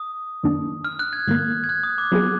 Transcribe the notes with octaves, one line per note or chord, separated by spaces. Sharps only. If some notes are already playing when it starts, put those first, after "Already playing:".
Already playing: D#6
F#2 D#3 A#3 D4
F6
F#6
G#6
G#2 D#3 A#3
G#6
F#6
D#6
D6
F#3 B3 F4 G#4 D6